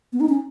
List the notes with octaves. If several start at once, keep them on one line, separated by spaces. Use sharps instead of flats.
B3
D#4
C#4